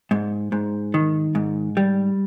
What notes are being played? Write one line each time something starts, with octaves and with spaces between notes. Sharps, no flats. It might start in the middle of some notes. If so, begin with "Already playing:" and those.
G#2
G#2
D#3
G#2
G3